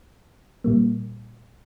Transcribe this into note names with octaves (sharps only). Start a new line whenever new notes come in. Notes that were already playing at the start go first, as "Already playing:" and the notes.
A#2 G3 A#3